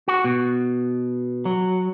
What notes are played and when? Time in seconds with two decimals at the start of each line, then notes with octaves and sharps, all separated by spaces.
0.08 F#4
0.24 B2
1.45 F#3